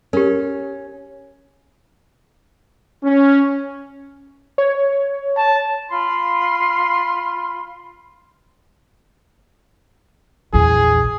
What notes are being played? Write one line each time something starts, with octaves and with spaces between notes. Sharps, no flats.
C#4 G4 A#4
C#4
C#5
A5
F4 B5 C6
A#1 E2 G#4